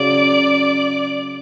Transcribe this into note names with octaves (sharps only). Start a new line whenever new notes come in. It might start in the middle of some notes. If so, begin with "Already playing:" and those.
Already playing: C#3 F#3 D5